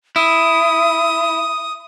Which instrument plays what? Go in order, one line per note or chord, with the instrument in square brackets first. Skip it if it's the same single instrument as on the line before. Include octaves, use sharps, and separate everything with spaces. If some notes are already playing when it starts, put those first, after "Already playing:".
[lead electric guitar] E4 [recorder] D#6